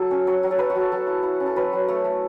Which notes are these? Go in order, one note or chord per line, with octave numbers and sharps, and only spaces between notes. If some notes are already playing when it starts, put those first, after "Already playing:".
Already playing: F#3 A4
C#4
F#3 C#5
F#3
A4
F#3 B4
F#4
F#3 A4
F#3 A4
E4
E4
C#4
A4
F#3 B4
F#3
A3 C#5
A3